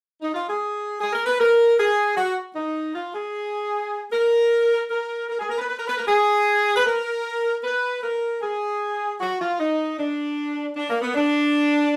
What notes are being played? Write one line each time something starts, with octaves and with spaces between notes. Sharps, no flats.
D#4
F4
G#4
G#4
A#4
B4
A#4
G#4
F#4
D#4
F4
G#4
A#4
A#4
A#4
G#4
A#4
B4
B4
A#4
B4
A#4
G#4
B4
A#4
B4
A#4
G#4
F#4
F4
D#4
D4
D4
A#3
B3
D4